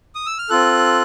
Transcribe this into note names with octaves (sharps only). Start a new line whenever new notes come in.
D#6
E6
F6
C4 F4 A4 F#6